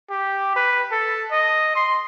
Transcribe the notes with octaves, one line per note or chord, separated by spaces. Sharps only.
G4
B4
A4
D#5
C6